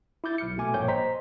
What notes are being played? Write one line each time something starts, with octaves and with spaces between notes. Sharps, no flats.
E4 D6 G6 A6
B1 F6 C#7
B2 A3 G#5 D6
A#1 G2 A#3 C#5 G5 G6
C5 D#5 A#5 C6 B6